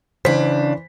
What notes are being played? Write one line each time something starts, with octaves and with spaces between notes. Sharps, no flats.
C#3 E3 D4 C5 B6